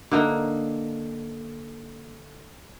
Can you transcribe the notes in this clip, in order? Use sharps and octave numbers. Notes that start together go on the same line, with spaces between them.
D3 A#3 D#4